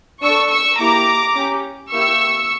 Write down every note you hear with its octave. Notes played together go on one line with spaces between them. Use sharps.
D4 A4 C#6 E6
C#6 E6
A#3 E4 G4 A#5 D6
C#4 G4
A#3 E4 G4 C#6 E6